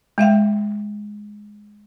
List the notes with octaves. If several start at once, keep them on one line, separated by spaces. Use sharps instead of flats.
G#3 E5 F5 G5